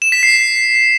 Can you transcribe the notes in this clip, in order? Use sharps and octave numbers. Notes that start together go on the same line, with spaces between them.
E7
B6
C7